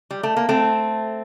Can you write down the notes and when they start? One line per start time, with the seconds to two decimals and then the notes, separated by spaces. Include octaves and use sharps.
0.11 G3
0.23 A3
0.36 A#3
0.49 A3 C4